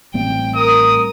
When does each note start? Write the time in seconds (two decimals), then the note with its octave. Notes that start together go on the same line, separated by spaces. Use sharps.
0.14 A1 G3 C4 G5
0.55 A#4 D#6